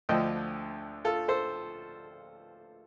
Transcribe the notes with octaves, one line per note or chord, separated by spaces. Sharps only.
D2 D3 F3 D#5 G5
F4 A4
A4 C5